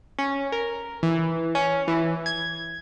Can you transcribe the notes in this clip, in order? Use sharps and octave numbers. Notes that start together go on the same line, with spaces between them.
C#4
A#4
E3
C#4
E3
G#6